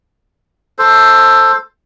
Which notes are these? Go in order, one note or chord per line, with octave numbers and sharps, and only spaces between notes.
A4 C5